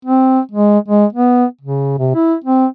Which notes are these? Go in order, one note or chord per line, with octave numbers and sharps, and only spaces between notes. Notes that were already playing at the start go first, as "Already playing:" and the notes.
C4
G#3
G#3
B3
C#3
C3
E4
C4